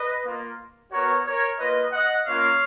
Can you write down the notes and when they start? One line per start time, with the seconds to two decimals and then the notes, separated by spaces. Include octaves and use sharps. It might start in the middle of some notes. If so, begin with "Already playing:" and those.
Already playing: B4 D#5
0.24 A#3 F4
0.91 B3 F#4 A#4 C#5
1.25 A#4 C#5
1.59 A#3 F4 B4 D#5
1.92 D#5 F#5
2.26 A#3 C#4 F4 C#5 F5